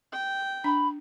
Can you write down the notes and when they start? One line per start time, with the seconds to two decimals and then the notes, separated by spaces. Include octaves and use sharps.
0.12 G5
0.64 D4 B5